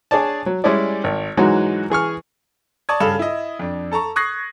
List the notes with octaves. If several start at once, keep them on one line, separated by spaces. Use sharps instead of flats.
D4 G#4 C#5 D5 A5
F#3
G3 G#3 C#4 E4 D5
G#1
G#2 E3 F#3 G#3 D#4 F#4
E3 G#4 C#6 F6
D5 A5 C#6 D#6 G#6
G2 C#3 A4 F5 B5 E7
E4 D#5
F2 D4
A4 A5 A#5 C#6
C#6 D#6 F#6 G#6 A#6 C7